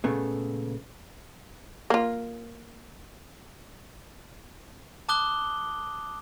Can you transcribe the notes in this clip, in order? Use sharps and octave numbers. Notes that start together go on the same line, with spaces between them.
A#2 C#3 A3 B3
A#3 F4
A5 D6 D#6 F#6 G7